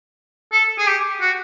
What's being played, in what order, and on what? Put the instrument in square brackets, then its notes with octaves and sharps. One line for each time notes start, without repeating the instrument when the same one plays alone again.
[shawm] A4
G#4
G4
F#4